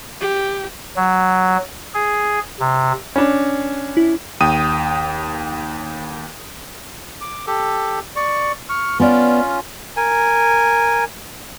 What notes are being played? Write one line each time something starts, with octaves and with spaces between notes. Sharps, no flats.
G4
F#3
G#4
C3
C#4 D4
E4
D#2 G5 D#6 D#7
D6
G4 A4
D5 C#6
C#6 F6
B3 C#4 F4 D5
A#4 G#5